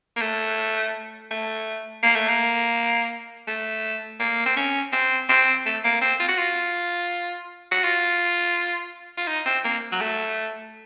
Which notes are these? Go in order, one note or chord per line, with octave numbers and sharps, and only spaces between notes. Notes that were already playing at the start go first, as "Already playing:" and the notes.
A#3
A3
A3
A#3
A3
A#3
A3
A#3
C4
C#4
C4
C4
A3
A#3
C4
F4
F#4
F4
F#4
F4
F4
D#4
C4
A#3
F#3
A3